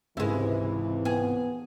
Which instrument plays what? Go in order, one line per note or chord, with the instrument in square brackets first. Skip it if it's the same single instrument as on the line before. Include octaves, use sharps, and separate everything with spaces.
[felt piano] G#1 C#2 [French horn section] C3 E3 [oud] G#3 E4
[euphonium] B3 [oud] G#4